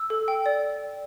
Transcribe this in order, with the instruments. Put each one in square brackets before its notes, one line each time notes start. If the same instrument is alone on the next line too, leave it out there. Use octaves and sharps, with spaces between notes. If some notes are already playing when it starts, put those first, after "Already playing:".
Already playing: [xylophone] E6
A4
G5
D5